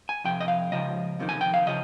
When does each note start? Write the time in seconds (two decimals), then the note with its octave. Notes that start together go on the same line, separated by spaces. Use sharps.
0.09 G#5
0.24 F2 C3 G5
0.40 D#5
0.48 F5
0.72 C#2 C#3 F3 D#5
1.19 F2 C3 D#3
1.29 G#5
1.41 G5
1.54 F5
1.67 C#3 F3 D#5